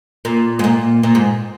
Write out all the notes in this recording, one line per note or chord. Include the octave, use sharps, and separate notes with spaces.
A#2
G#2
A#2
A#2
G#2